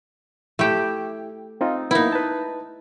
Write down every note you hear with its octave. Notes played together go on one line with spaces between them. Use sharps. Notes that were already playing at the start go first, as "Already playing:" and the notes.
A3 E4 G4
C4 D#4 F4
A#3 B3 D#4 E4
B4 A5